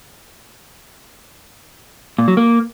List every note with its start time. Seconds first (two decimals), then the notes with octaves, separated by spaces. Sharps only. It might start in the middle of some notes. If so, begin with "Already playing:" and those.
2.19 A#2
2.28 F#3
2.37 A#3